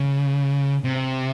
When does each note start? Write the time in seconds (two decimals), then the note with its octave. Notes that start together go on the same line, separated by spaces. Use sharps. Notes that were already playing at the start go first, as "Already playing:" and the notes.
Already playing: C#3
0.84 C3